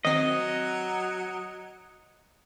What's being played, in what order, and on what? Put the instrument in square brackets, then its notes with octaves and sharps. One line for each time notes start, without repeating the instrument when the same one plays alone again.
[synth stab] D#3 C4 [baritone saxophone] F#3 [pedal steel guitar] D#5